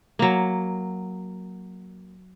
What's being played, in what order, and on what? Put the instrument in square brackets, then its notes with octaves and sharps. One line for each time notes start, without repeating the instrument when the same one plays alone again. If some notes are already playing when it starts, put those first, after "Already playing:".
[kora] F#3 A#3